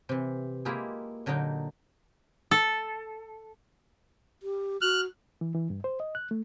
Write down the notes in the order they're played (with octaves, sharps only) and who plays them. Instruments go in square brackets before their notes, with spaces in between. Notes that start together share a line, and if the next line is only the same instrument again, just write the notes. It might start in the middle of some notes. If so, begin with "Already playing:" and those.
[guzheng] C3 E3
G#3 A#3 E4 F4 G4 G#4
A#2 D3 F#3 D#4 G5
[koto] A4
[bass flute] G4
[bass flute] F#4 [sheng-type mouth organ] F6 F#6
[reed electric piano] E3
E3
G2
C5
D#5
F#6
A3